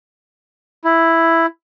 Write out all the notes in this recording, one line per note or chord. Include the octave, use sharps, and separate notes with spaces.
E4